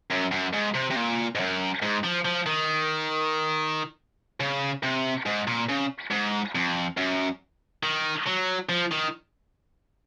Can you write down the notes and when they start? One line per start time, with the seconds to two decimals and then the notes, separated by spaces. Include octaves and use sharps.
0.10 F#2
0.32 F#2
0.53 G#2
0.75 C3
0.91 C3
0.96 A#2
1.35 G#2
1.40 F#2
1.82 G#2
2.04 F3
2.25 F3
2.46 D#3
4.40 C#3
4.83 C3
5.26 G#2
5.47 A#2
5.69 C#3
6.11 G#2
6.55 F2
6.97 F#2
7.83 D#3
8.27 F#3
8.69 F3
8.91 D#3